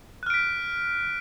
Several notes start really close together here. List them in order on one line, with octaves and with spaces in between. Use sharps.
F#6 F6 D7 B6